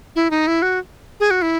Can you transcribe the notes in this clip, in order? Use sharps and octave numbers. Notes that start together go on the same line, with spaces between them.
E4
D#4
E4
F#4
G#4
F#4
E4